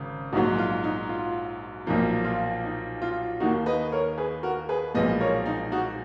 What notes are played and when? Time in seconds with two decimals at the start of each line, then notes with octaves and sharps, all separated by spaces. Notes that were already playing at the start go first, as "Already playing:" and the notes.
Already playing: G#1 C#3
0.32 A#1 G#2 F#3 D#4 F#4
0.58 F4
0.84 D#4
1.09 F4
1.86 B1 A#2 F3 A#3 D#4
2.25 F4
2.64 D#4
3.02 F4
3.40 D#2 D#3 A#3 D#4 F#4
3.66 B4 D#5
3.92 A#4 C#5
4.18 G#4 B4
4.43 F#4 A#4
4.69 G#4 B4
4.94 B1 A#2 F3 G#3 B4 D#5
5.20 A#4 C#5
5.46 D#4
5.72 D#4 F#4